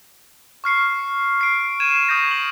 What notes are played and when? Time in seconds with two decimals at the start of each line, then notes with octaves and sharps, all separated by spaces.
0.64 C#6 F6 C7 C#7
1.41 C7 D7
1.80 G#6 D#7 E7
2.08 C#6 D#6 G6 A#6 E7
2.31 F#7